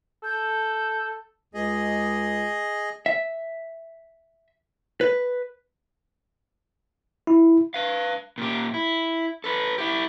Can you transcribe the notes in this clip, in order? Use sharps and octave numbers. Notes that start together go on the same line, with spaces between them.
A4 G6
C#2 G#4 D#5
E5
B4
E4
B4 F5
A#2 G4
E4
A4 B4
E4 G4